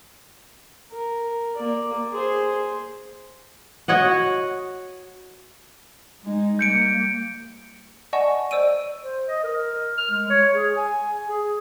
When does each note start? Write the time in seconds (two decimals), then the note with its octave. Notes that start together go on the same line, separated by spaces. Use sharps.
0.91 A#4
1.56 A#3 D5
2.12 G#4 C5
3.88 F#4 C#5 D#5 F#5
6.23 G#3 D#4
6.59 G3 A#3 G6 C#7 D7
8.13 D5 D#5 F#5 G#5 A5 C#6
8.51 C5 D5 E6 D7 D#7
9.02 C5
9.27 D#5
9.43 A#4
9.98 F6
10.11 G#3
10.30 C#5
10.54 G#4
10.77 G#5
11.28 G#4